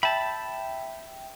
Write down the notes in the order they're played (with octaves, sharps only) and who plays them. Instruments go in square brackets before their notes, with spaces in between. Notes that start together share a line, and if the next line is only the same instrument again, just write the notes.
[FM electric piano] E5 G5 [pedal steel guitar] A5 B5